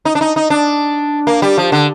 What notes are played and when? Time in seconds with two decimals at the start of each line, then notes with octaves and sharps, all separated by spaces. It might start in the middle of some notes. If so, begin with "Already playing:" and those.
0.05 D#4
0.15 D4
0.21 D#4
0.36 D#4
0.50 D4
1.27 A#3
1.42 G3
1.57 F3
1.72 D3